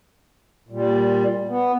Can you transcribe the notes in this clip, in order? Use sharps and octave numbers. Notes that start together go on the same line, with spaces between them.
A#2 G3
B3